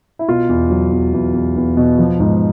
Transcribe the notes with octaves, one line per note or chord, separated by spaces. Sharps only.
E4
B2 F4
E2
F#3
E2
E2
E2
E2
B2
F3
G#2